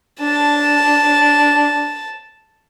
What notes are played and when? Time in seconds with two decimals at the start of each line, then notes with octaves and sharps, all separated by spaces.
0.21 D4 A5